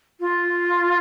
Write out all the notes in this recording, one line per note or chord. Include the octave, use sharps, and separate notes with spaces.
F4